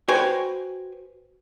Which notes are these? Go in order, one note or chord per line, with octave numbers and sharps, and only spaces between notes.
F#4 B4 C5 G5 G#5